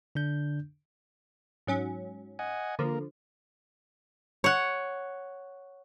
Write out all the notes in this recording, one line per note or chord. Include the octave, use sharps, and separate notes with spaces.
D3 D4 G6
G#2 F#3 C#4
D#5 F#5 G#5
D3 F3 A#3 A#4
C#5 F#5